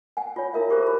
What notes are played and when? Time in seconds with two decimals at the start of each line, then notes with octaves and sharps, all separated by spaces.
0.17 F#5 G#5
0.36 F4 C#5
0.53 E4 F4 A#4 E5 F5
0.70 F4 G4 G#4 A#4 C5
0.83 A#4 B5